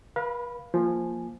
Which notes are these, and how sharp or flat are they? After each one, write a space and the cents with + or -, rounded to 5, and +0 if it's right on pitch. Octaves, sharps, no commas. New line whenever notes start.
B4 -45 F5 +0 B5 +0
F3 +0 A#3 +0 G#5 +0